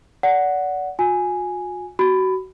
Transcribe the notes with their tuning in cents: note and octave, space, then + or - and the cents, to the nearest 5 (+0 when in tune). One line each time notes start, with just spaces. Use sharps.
D5 -30 F#5 +0
F#4 -45 G#5 +0
F#4 +25 B5 +15